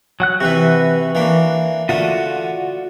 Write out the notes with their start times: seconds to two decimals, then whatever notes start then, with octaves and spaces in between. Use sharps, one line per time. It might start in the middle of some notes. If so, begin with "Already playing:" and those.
0.20 F#3 F#5 F#6
0.41 C3 E3 F#4 B4 E5
1.15 E3 A#3 D4
1.89 D3 A3 F4 F#4 D5 D#6